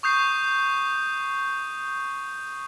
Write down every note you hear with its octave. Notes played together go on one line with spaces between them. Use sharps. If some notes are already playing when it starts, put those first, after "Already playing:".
C#6 D#6 G6 C7